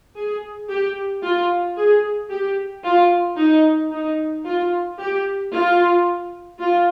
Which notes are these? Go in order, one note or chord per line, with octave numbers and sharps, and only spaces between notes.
G#4
G4
F4
G#4
G4
F4
D#4
D#4
F4
G4
F4
F4